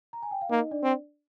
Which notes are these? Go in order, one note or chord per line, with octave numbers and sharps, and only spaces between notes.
A#5
G#5
G5
F5
A#3 D#4 D#5
D4 D5
C4